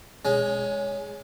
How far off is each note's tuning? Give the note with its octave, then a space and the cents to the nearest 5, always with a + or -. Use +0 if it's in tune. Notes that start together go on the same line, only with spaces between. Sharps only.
G#3 -5 C#4 +15